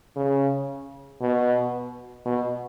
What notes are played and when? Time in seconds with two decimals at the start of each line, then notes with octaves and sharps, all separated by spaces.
0.16 C#3
1.21 B2
2.25 B2